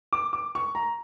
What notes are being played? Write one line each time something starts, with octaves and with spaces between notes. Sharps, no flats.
D6
D6
C#6
A#5